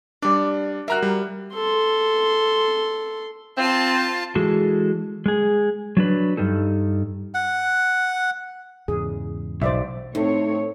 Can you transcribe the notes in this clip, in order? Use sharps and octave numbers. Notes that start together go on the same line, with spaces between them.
G3 D4 D5
A#3 F#4 E5 A#5 F#6
G3
A4 C6
C4 F4 A5
E3 G#3 F#4 G#4 A4
G#3 G#4
F#3 D4 B4
G2 G3 D#4 A4
F#5
E2 G#2 C#3 G#4
B1 C5 D5 E5
A2 A3 C4 D#4 C#5